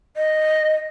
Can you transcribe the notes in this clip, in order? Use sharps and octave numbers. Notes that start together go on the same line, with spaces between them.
D#5